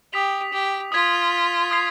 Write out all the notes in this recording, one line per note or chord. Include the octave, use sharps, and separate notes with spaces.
G4 D#6 B6 F7
G4
F4 D#6 G#6 B6
D#6 G#6 C7 F7